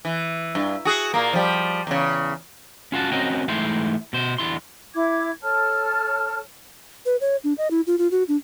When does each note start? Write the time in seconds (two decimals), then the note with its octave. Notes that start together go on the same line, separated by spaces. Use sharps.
0.05 E3
0.55 G2
0.85 F#4 G#4
1.14 A#2 A#3
1.33 F3 G3
1.87 E2 C#3
2.92 C#4 F4 F#4 A5
3.12 C4 C#4 F#4 A#4 D#5 G5
3.48 G#2 E3 A3 E4 G5 C6
4.13 B2 C5
4.38 E2 D3 E4 C6
4.95 E4 D6 G#6
5.43 A4 C#5 A5 F6
7.06 B4
7.21 C#5
7.44 D4
7.58 D#5
7.71 E4
7.87 F4
7.98 F4
8.11 F#4
8.28 D4